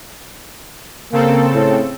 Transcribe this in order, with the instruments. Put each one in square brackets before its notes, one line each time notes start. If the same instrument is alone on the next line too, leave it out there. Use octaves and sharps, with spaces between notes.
[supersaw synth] C#3 C4 A4 [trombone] A#3
[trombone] A2